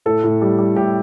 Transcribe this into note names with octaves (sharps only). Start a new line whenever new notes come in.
A2 A4
A2
G3
G3
A2 G4